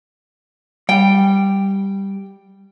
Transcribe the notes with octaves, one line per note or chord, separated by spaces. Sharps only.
G3 G5